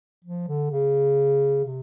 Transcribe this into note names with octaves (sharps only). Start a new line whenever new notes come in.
F3
D3
C#3
C3